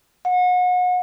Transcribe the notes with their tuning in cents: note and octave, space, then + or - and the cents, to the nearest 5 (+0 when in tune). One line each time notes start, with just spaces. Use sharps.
F#5 -35